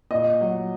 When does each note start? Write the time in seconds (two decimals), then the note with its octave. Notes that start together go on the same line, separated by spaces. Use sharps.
0.11 A#2 D#5
0.41 F#3